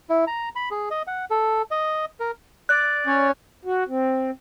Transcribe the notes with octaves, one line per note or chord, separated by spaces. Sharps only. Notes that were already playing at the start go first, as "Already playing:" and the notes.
E4
A#5
B5
G#4
D#5
F#5
A4
D#5
A#4
D5 F#6
C#4 C#5
F#4
C4